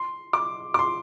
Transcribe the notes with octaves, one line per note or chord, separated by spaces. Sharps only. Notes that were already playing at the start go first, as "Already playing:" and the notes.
Already playing: C6
D6
D6
C6